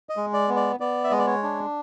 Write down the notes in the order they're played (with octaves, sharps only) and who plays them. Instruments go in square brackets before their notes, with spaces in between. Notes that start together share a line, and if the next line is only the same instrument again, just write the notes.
[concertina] D#5
G#3
D5
B3
D5
B3 D5
E5
G#3 D#5
D5
C#5
D4